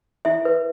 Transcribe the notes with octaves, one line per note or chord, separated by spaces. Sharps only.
E4 E5
B4